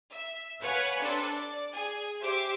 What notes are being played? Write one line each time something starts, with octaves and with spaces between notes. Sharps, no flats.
E5
B4 C#5 F5 F#5 G#5 B5
C3 D4 A4 B4
D5
G#4 G#5
G4 C5 E5 D6